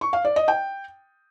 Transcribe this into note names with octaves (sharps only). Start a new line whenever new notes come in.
C#6
F5
D5
D#5
G5